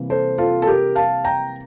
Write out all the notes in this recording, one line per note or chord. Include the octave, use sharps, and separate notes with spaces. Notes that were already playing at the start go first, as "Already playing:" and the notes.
Already playing: C3 E3 G3 A#3
A4 C5
F4 A4
A4
G4 A#4
F5 A5
G5 A#5